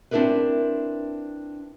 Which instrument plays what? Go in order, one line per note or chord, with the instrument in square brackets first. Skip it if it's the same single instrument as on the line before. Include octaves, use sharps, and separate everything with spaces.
[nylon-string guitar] C4 D4 E4 G#4 A#4 B4